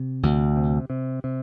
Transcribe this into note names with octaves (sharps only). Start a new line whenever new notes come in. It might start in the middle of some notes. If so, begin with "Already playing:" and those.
Already playing: C3
D2
C3
C3
C3